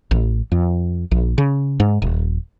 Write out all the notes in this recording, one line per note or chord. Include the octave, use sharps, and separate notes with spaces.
A1
F2
A#1
C#3
G#2
D#1